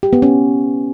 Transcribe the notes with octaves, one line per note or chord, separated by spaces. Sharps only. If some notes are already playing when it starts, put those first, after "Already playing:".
G4
B3
C#4